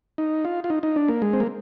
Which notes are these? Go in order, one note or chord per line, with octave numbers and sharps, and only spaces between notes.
D#4
F4
F4
D#4
D#4
D4
A#3
G#3
C4
A#3